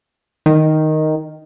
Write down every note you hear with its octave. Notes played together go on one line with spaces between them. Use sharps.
D#3